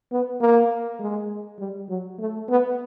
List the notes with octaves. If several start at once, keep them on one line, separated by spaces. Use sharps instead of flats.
B3
A#3
G#3
G3
F#3
A3
B3